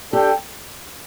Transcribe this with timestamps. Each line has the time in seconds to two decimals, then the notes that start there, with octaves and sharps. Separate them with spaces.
0.13 D4 G4 A4 D5 G5